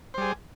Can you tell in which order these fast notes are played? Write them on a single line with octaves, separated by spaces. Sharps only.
C5 G3 G#4